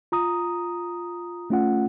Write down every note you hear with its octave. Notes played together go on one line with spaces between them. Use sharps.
F4 A#5 D#6
A3 C#4 F4 F#5